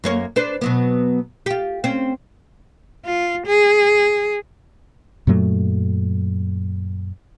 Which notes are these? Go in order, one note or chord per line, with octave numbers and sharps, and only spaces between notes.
F#2 A#3 C#5
D4 B4 C5
B2 F#3 B3
F4 G4
C4 C#4
F4
G#4
F#2 A#2 F#3 A3